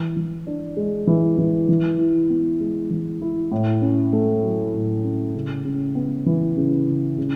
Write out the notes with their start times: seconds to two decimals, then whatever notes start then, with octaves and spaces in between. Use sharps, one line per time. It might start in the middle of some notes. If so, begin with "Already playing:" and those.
Already playing: E3
0.16 E3
0.47 D4
0.77 G#3
1.07 E3
1.38 E3
1.69 E3
1.99 E4
2.30 B3
2.60 G#3
2.91 E3
3.21 E4
3.52 A2
3.82 C#4
4.13 A3
4.43 F#3
4.74 A2
5.04 C#4
5.35 C#3
5.65 C#3
5.95 B3
6.26 E3
6.57 C#3
6.87 C#3
7.18 C#3